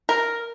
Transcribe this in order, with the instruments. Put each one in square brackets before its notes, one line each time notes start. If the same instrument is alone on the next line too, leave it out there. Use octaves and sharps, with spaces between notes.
[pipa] A#4